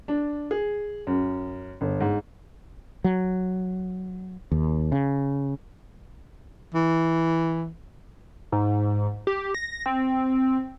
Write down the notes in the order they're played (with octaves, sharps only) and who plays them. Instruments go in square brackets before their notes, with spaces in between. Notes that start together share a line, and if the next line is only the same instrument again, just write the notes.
[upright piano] D4
G#4
F#2
G1
G#2
[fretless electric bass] F#3
D#2
C#3
[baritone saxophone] E3
[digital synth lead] G#2
G4
A#6
C4